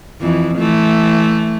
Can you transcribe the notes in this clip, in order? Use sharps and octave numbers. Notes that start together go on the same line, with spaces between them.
F2 E3
E3 A3